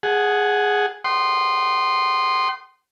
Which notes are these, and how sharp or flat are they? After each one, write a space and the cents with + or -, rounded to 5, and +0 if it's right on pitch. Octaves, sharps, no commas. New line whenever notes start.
G#4 +0 F#5 +0 A5 -40
G5 -45 C6 +0 D#6 -30